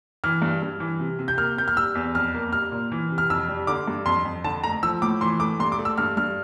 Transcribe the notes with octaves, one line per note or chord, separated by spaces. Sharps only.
E3 F6
G2
G2
E3
C3
C3
G6
A#3 F6
A#3 G6
F6
G3 E6
E2
F2 F6
A#3
G3 F6
A#2
E3
C3
F6
F2 E6
G3
D3 D6
G2
F2 C6
F2
D3 A5
A3 A#5
F3 E6
A2 D6
E3 C6
A3 D6
G2 C6
D6
A3
E6
G2 F6
G2 F6